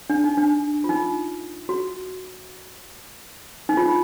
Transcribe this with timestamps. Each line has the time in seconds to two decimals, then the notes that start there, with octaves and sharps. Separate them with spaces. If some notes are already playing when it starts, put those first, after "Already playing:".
0.10 D4
0.24 D#4
0.37 D4
0.84 F4
0.89 D#4
1.69 F#4
3.69 D#4
3.77 F4
3.86 D#4